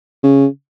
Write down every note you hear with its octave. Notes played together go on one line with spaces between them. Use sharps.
C#3